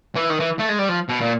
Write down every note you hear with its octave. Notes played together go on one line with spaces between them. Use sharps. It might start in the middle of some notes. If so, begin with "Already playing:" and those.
E3
D#3
E3
A3
G#3
G3
F3
B2
A#2